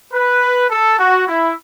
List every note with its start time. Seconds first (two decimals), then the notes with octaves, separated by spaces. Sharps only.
0.13 B4
0.71 A4
0.99 F#4
1.28 E4